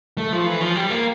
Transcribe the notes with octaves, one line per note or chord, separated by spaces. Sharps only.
A3
F3
E3
F3
G3
A#3